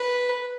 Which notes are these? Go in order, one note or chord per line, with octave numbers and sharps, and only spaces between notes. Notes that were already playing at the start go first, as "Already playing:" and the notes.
Already playing: B4